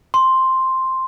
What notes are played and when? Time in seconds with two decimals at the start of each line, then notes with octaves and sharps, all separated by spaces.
0.14 C6